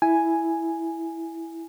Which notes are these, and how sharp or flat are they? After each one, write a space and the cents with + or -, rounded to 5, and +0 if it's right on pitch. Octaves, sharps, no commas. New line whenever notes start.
E4 +0 G#5 +0